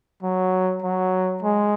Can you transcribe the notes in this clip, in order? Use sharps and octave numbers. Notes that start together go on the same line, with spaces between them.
F#3
F#3
G#3